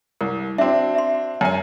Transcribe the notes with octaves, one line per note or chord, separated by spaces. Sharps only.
C2 A#4
C4 D4 F#4 E5
E5 C6
F#2 G#5